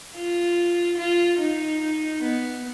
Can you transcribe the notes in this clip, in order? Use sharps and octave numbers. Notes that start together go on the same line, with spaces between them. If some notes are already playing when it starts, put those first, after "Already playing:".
F4
F4
D#4
B3